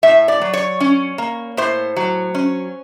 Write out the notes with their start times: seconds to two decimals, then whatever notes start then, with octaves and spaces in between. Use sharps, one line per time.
0.03 A2 E5
0.28 D5
0.41 F#3
0.53 C#5
0.80 C#4
1.18 A#3
1.57 A2 C5
1.96 F#3
2.35 C#4